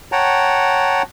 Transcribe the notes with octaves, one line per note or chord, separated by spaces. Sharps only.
C#5 F#5 G5 A5 A#5